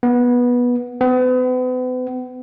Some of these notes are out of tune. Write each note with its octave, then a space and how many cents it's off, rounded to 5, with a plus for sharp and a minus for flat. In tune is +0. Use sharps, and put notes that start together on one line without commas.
B3 -15
B3 +40